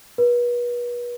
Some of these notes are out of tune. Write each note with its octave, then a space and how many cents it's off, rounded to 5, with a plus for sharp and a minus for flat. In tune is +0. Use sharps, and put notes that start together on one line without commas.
B4 -35